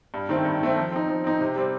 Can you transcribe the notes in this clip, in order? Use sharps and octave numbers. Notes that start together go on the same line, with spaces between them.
G2
D#3 A3 C4
G2
D#3 A3 C4
F3
C4 D#4
F3
C4 D#4
C3
G3 C4